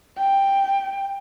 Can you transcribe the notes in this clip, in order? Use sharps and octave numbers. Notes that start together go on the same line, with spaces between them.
G5